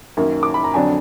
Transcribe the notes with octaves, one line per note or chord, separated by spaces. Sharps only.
F#2 D#3 A#3
D6
B5
A#5
F2 D3 F#3 D4 G#5